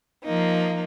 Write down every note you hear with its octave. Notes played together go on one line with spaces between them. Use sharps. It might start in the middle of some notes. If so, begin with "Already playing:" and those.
F3 A#3 D#4